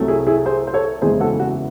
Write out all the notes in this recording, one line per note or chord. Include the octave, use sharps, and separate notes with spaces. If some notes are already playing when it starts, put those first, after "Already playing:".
Already playing: C2 C3 F#3 A3
E4 G#4
E4 G#4
G#4 C5
C5
A4 C#5
F#1 E2 C#3 G#3 G#4 C5
F#4 A4
F#4